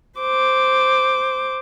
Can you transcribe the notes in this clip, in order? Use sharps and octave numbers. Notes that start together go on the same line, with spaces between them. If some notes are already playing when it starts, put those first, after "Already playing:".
C5 D6